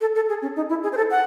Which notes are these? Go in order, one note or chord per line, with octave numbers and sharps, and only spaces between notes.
A4
A4
G#4
C#4
D#4
E4
G#4
C5
A4
F#5